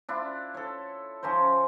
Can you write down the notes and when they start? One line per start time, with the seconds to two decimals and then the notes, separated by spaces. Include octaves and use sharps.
0.09 D4 E4 F4
0.54 A4 C#5
1.23 F3 C#4 A#4 C5